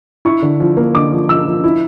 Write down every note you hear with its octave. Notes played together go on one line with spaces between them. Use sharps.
E4 C#6
D3
F3
A#3
D3 D6
F3
F3 E6
F3
E4